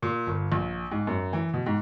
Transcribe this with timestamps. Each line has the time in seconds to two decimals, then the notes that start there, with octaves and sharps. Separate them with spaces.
0.02 A#2
0.27 G1
0.52 A#1
0.91 G#2
1.07 F#2
1.33 E3
1.54 B2
1.66 G#2